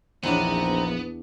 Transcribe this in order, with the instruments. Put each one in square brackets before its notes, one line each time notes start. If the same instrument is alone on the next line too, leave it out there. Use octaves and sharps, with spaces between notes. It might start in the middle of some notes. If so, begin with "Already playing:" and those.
[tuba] A#1 [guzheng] E2 D4 [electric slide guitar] B3 [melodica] C4 D#4